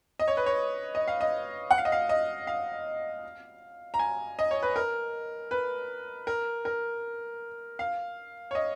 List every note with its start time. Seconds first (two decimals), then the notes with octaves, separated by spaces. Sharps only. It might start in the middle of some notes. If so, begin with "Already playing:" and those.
0.19 D#5
0.28 C#5
0.37 B4
0.46 C#5
0.95 D#5
1.08 F5
1.21 D#5
1.71 F#5
1.78 F5
1.85 D#5
1.92 F5
2.09 D#5
2.47 F5
3.94 A#5
3.99 G#5
4.39 D#5
4.51 C#5
4.63 B4
4.76 A#4
5.51 B4
6.27 A#4
6.65 A#4
7.79 F5
8.51 C#5
8.55 D#5